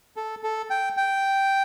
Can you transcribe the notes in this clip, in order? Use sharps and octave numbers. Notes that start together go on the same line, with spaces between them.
A4
A4
G5
G5